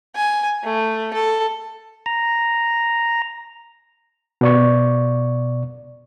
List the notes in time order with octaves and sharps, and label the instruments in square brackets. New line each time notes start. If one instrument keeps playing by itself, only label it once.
[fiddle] G#5
A3
A4
[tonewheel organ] A#5
[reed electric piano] B2 D5 C#6